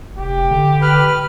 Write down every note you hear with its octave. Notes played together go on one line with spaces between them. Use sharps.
F1 G4
D3
B4 F6